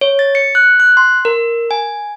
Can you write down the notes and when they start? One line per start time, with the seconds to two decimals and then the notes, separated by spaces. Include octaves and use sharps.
0.01 C#5
0.19 A6
0.35 C#7
0.55 F#6
0.80 F#6
0.97 C6
1.25 A#4
1.71 G#5